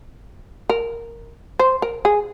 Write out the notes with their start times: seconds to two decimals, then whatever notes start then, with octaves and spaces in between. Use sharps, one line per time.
0.70 A#4
1.59 C5
1.82 A#4
2.05 G#4